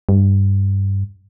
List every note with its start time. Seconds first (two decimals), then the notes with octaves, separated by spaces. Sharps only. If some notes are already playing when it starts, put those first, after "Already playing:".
0.09 G2